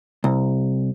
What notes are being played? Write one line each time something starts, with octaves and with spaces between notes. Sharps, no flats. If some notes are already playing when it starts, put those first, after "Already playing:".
C2